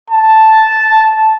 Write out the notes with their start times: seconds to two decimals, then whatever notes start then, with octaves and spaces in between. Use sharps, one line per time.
0.10 A5